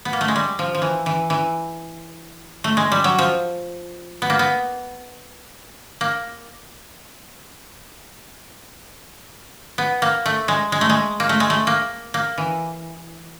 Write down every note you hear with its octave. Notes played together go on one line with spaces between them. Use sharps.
B3
A#3
A3
G#3
G3
F3
F3
E3
E3
E3
A3
G#3
G3
F#3
F3
B3
A#3
B3
A#3
B3
A#3
A3
G#3
G#3
A3
G#3
A#3
A3
G#3
A3
A#3
A#3
E3